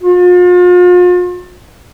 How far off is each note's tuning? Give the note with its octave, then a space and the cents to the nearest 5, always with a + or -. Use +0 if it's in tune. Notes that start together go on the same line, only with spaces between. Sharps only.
F4 +40